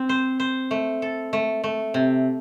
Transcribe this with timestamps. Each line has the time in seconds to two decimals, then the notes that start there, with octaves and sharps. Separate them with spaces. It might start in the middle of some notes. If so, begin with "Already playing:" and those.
Already playing: C4
0.09 C5
0.40 C5
0.71 A3
1.02 A4
1.33 A3
1.64 A3
1.94 C3